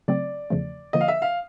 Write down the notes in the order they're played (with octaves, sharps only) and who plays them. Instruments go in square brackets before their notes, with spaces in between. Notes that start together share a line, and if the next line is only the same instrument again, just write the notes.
[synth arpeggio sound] C#3 F#3 A3 C4 [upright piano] D5
[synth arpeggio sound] E2 C#3 F3 A3
[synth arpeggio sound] D3 F3 A#3 [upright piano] D#5
[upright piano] F5
E5
F5